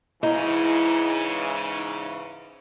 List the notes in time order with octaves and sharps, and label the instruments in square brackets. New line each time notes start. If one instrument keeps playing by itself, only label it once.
[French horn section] G#2 C#3 E3 [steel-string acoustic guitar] D#4 [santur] E4